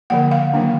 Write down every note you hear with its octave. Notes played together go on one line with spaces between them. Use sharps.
D3 F3 A#3 F#5
F5
D#3 F#3 A#3 D4